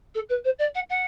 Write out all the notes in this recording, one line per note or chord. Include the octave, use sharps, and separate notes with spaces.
A4
B4
C5
D5
F#5
F#5